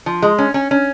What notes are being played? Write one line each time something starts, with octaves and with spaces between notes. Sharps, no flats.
F3
G#3
C#4
C#4
C#4